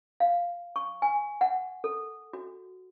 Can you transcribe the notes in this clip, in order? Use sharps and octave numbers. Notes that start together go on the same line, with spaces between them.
F5
C#6
G#5
F#5
A4
F#4